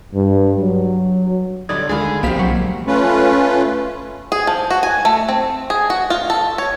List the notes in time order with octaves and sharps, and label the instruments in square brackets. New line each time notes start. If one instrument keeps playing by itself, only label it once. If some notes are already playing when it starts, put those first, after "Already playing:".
[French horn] G2
F#3
[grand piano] B1 D3 G3 [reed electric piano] D5 D#6 G#6
[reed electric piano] D2 G#3 B5 [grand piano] D3 D#3 F4 [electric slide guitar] G#4
[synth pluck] B1 F5 B6 [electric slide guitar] F3 A#3 [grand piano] C4 F4 G4
[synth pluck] F#3
[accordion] A3 C#4 F4 B4
[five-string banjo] G#4
F3
F#4
G#5
A3
C4
G#4
F#4
F4
A4
C#5